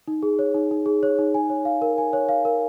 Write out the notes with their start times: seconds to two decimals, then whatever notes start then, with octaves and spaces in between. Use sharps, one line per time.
0.08 D#4
0.23 G#4
0.39 C#5
0.54 D#4
0.71 D#4
0.86 G#4
1.03 C#5
1.19 D#4
1.34 G#5
1.50 C#5
1.65 F5
1.82 A#4
1.98 G#5
2.13 C#5
2.29 F5
2.45 A#4